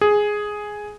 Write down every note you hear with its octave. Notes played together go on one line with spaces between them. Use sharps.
G#4